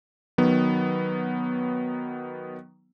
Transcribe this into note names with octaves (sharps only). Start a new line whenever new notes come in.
D#3 F#3 B3